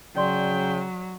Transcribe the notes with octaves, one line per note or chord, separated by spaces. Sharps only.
C#3 F#3 D5 G5 C6